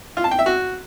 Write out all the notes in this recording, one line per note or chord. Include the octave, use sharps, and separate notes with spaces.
F4
A5
G5
E5
F#4